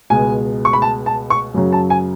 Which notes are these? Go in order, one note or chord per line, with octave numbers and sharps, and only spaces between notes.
C#2 B2 G#3 G#5
C#6
B5
A5
A5
C#6
F#2 C#3 F#3
A5
G#5